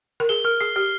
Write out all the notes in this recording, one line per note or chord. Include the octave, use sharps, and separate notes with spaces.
A#4
G#4 G7
A#4 F6
G#4 C7
G4 F6